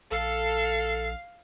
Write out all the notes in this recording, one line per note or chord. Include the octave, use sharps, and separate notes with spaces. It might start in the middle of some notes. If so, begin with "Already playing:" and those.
A#1 A4 F5